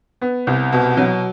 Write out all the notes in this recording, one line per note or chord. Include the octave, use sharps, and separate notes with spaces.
B3
C2
B2
F#3